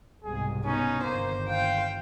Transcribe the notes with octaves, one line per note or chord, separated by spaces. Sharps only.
C2 G#2 B2 G#4
B3 C#4 D#4
G1 A#2 D#3 A#3 C5
C5 F5 G5